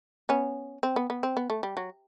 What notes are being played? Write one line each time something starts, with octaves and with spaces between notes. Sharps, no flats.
B3 C#4
C4
B3
B3
C4
B3
A3
G3
F#3